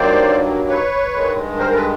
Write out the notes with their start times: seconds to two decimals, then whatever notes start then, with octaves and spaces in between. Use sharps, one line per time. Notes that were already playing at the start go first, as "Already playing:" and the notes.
Already playing: G2 D#3 F#3 A#3 C5 D5
0.68 B4 C#5
1.13 G2 D#3 G#3
1.59 A#4 C5
1.69 A#4
1.75 A4 B4